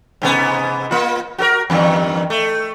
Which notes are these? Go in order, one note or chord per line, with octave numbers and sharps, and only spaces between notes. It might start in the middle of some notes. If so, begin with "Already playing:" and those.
G#2 C3 B3
A#3 F4
F#4 A4 A#4
E2 G2 D#3
A3